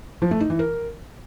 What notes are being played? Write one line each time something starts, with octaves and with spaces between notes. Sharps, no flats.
F3
A3
D#4
E3
A#4